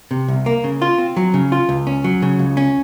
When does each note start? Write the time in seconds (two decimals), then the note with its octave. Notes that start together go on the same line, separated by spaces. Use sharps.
0.11 C3
0.28 C2
0.46 A#3
0.64 C#3
0.82 F4
0.98 C4
1.17 F#3
1.34 C#3
1.52 F4
1.69 C#2
1.87 C#4
2.04 F#3
2.22 C#3
2.39 C#2
2.57 C#4